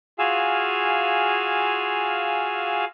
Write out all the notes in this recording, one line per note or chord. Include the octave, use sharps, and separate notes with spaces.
F4 F#4 G#4 F5 G#5 E6